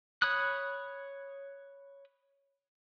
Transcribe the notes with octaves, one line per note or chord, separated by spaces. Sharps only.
C#5 B5 D#6 F#6